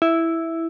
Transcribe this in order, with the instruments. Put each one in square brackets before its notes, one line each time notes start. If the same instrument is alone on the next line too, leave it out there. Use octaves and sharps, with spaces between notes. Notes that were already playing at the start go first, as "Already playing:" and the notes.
[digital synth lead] E4